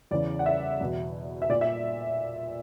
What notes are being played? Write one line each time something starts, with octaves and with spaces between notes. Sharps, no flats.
E2 C#3 E3 D5
F#5
E5
E2 B2
E5
A#2 D5
E5